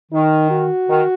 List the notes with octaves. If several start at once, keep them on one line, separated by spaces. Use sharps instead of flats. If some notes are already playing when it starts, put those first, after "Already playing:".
D#3 D#4
F#4
D#3